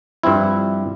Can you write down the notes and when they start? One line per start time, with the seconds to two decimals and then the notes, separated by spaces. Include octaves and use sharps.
0.23 G2 F3 C4 E4